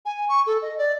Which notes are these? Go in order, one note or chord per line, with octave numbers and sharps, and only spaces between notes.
G#5
C#6
A4
D#5
D5